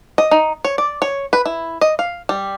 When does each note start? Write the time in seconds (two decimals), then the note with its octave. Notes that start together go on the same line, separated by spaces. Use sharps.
0.18 D#5
0.31 D#4
0.65 C#5
0.78 D5
1.02 C#5
1.33 B4
1.46 E4
1.81 D#5
1.99 F5
2.29 G3